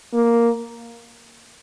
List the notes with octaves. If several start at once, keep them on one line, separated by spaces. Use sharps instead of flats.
A#3